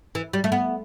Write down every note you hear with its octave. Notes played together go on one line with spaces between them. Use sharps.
E3
G3
A3
B3